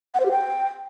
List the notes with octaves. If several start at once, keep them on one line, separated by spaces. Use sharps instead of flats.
F#5
C5
G4
G5